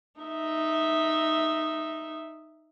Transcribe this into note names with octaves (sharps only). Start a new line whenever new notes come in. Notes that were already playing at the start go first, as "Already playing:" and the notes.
D#4 E5